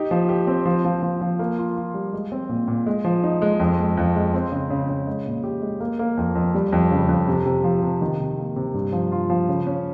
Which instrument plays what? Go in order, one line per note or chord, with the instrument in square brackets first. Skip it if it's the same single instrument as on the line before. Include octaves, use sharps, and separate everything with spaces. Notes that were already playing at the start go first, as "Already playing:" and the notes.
Already playing: [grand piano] D#4 G4
F3
G4
C4
F3
F3
F3
F3
A#3
F4
F4
G3
G#3
C4
A#2
A#2
G#3
F3
D#4
G#3
F2
G#3
F2
G#3
C4
C#3
C#3
C#3
G#3
A#2
G4
G#3
A#3
A#3
F2
F2
G3
F2
C#3
F2
C3
C3
F3
C3
D#3
C3
A#3
C3
G2
F3
F4
F3
C#3
C#4